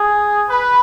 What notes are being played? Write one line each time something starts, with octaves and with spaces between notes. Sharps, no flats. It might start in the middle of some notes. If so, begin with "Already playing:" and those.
Already playing: G#4
B4